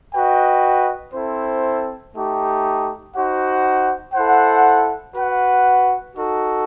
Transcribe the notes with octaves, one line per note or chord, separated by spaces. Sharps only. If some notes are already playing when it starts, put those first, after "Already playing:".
F#4 B4 D#5 G5
C4 E4 A4 C5
A3 D#4 G4
D#4 F#4 C5 F#5
E4 A4 C5 F#5
F#4 B4 F#5
D#4 F#4 A4